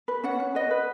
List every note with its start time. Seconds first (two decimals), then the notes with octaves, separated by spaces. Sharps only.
0.08 B4
0.24 C#4 F#5
0.40 C#4
0.55 B4 D#5
0.71 B4